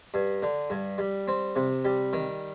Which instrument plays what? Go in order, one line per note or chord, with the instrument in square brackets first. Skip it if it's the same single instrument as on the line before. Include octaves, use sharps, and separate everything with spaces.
[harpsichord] G2
D3
G2
G3
C4
C3
G3
D#3